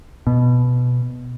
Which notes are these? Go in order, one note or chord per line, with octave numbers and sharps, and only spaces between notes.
B2